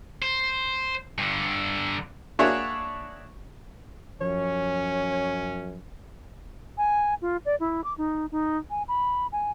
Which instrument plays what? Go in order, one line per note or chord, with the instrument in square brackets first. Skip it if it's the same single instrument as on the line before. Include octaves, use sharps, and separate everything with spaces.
[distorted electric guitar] C5
G2 D3
[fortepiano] A#3 D4 F#4 G#4 C#5 E5
[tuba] F#2 [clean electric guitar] F3 [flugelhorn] C#4 [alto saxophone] C#5
[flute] G#5
F4
D5
E4
D6
D#4
D#4
G#5
B5
G#5